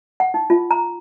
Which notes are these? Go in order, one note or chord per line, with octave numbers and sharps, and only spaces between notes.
F#5
D#4
F4
A#5